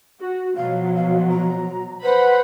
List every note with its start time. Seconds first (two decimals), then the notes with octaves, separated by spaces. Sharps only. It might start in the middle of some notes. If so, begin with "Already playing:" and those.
0.21 F#4
0.56 B2 F3 F#3 F5
0.95 F5
1.29 A#5
2.03 B4 C5 F#5 B5